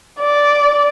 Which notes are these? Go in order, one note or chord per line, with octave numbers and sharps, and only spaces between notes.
D5